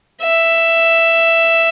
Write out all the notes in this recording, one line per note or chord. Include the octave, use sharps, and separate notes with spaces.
E5